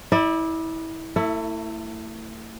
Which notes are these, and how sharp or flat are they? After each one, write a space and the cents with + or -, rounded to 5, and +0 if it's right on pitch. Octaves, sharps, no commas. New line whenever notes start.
E4 -25 D5 +25
A3 +35 E4 +0